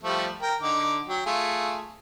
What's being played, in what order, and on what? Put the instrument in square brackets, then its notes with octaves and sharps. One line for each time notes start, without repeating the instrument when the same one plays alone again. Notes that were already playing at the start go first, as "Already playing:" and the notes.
[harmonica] F3 G3 A3
A#4 G5
D3 D#4 D6
F#3 G5
A3 F4 G#4